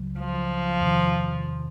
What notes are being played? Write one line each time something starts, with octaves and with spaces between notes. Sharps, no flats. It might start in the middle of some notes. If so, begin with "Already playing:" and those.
Already playing: C#2 C#3 F#3
F3
E2 C3 D#3